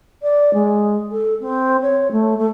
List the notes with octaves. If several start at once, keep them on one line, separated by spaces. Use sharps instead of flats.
D5
G#3
A4
C4
C#5
A3
A3